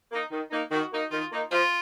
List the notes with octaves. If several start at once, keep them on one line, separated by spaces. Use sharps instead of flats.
A#3 D#4
D#3
A#3 D#4
D#3 F#4
A#3 D#4
D#3 F4
A#3 D#4
F3 F4